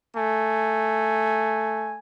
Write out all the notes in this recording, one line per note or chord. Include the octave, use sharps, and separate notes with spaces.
A3 G#5